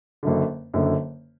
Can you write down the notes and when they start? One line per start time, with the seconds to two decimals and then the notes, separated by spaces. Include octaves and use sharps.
0.23 F#1 F#2 D3
0.74 F#1 F#2 D3